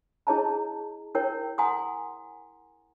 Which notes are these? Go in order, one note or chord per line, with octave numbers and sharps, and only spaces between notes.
E4 G#4 C#5 D#5 A5 A#5
E4 A#4 C#5 G5
F#5 G#5 A#5 C6 D#6